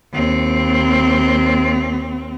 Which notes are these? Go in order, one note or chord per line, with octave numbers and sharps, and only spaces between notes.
D#2 C4